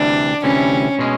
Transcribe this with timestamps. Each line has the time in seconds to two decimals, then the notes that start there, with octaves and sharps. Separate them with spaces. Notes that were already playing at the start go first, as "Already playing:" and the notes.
Already playing: D2 C3 E3 G3 D4
0.44 D2 C3 E3 G3 C#4
0.99 B2 G#3 C#4